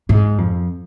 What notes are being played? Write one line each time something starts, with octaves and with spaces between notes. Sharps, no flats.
G#2
F2